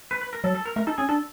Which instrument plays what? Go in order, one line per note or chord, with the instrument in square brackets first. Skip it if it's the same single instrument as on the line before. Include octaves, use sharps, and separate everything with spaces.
[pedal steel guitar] B4
B4
A#4
[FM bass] F#3 [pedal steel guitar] A4
[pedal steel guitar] A4
A#4
[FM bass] A3 [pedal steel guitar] A#4
[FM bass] D#4 [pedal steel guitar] A4
[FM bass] C#4 [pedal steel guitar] G#4
[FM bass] D4 [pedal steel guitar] A4